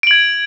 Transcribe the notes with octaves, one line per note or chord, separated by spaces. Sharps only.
G#6 D7 F#7